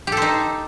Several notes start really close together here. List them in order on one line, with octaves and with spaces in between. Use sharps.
G4 A4 C5 D#4